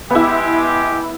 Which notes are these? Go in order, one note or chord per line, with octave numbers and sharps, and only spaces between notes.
G#3 B3 E4 G4